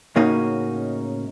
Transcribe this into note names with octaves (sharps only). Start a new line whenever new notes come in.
A2 C#3 A#3 C#4 D#4 F#4